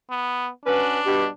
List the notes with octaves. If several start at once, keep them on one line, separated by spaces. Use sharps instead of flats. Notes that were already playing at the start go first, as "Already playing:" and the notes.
B3
C#4 D4 F#4 B4
G2 B2 G3